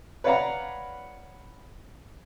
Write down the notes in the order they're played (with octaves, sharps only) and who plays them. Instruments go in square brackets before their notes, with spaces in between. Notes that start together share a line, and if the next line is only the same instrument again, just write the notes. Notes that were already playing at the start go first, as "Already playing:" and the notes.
[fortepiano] B4 C#5 D5 F5 F#5 A#5